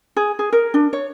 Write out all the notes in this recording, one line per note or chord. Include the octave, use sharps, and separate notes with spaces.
G#4
G#4
A#4
D4
C#5